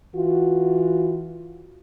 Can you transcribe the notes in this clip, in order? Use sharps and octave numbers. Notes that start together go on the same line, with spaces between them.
E3 F4 F#4